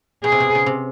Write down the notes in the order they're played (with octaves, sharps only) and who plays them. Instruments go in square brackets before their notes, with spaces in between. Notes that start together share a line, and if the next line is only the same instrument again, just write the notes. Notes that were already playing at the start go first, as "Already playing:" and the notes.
[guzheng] B2 [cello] G#4
[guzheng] C3
B2
C#3
C3